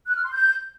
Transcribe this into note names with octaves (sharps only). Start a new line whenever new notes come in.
F#6
F6
C6
G6